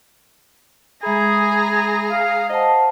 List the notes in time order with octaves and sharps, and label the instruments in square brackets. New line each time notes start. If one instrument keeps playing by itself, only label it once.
[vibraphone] G#3 E5 B5 [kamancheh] G#4 A#5 [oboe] G#5
[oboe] F5
[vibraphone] C5 F#5 A5 [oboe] D#5